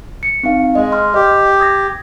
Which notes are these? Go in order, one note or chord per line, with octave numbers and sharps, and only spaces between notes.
C#7
C4 D#4 F5
G#3 D#5
C6 F6
G4 D#5
D#6 G#6 A#6